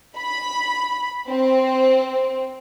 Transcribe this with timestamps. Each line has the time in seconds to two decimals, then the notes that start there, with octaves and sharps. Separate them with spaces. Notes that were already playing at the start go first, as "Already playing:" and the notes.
0.17 B5
1.28 C4